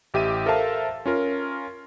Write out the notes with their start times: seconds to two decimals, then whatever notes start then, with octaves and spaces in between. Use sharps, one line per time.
0.14 A1 G4 E5 D#7
0.46 A4 A#4 C5 E5 F5 A5
1.06 C#4 F4 A#4